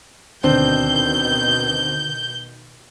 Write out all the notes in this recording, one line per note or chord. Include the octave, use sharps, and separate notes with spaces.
D2 B2 D3 D#3 C4 D4 C5 G6